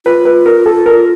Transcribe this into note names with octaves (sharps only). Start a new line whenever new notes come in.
F4 B4
B4
A#4
A4
A#4